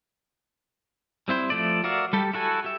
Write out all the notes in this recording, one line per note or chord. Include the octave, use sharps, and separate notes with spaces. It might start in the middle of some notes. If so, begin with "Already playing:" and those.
G3 C4 E4 C5
F3 A3 D5
F#4 A#4 D5 E5 F5
G3 G4 A4
E4 F#4 A4 G#5
G4 E5